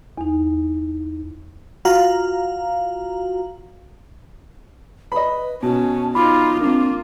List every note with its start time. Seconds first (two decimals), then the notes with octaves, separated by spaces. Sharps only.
0.18 E2 D#4
1.85 F4 F#4 F5 A#5
5.12 B4 D#5 B5
5.63 B2 C#4 A5
6.15 D#4 F4 B5 D6
6.62 A#3 C4 D4 F4